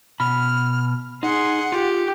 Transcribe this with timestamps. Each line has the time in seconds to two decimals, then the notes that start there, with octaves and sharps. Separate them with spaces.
0.20 B2 B5 F6
1.23 D#4 G#4 F#5 C6
1.72 F4 G4